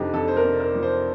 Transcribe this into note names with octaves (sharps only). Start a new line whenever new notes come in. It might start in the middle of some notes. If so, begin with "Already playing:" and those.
Already playing: F2 C3 F3 D4 D#4 G4
F2 A4
C5
A#4
C3
A#4
F3
C5